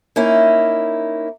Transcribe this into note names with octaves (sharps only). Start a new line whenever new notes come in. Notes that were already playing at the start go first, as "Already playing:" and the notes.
A#3 C#4 D#4 E4